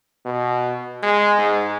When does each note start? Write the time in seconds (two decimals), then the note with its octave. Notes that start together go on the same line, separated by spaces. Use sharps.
0.25 B2
1.03 G#3
1.39 G#2